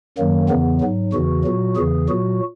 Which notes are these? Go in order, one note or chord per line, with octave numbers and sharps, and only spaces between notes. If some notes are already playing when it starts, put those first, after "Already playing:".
F#2 D#3 F#3 A#3
E2 C#3 E3 B3
G#2 F#3
E2 C#3 E3 F#4
A#2 F#3
E2 C#3 E3 G#4
A#2 F#3 F#4